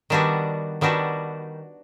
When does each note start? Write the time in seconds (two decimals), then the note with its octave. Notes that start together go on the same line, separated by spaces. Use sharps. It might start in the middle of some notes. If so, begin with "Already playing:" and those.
0.10 D#3 G3 B3 D4 F#4
0.81 D#3 G3 B3 D4 F#4